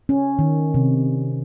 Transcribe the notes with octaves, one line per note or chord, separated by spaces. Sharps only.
C#4
D#3
C3